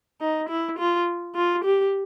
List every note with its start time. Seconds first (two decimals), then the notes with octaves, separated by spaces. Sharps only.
0.21 D#4
0.49 E4
0.79 F4
1.35 F4
1.64 G4